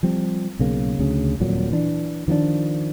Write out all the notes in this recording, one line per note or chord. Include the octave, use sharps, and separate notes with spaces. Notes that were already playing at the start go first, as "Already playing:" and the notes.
F3 G3 C4
B1 C#3 A#3
D2 C#3
D#1 F2 A#2 F#3
E3 D4
D#3 F3 A#3 D4